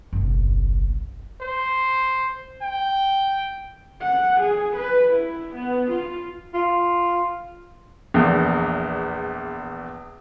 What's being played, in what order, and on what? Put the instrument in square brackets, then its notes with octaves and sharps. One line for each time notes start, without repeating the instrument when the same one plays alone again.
[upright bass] F#1 B1
[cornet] C5
G5
[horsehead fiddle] F#5
G#4
B4
E4
B3
F4
[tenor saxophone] F4
[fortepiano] A#1 E2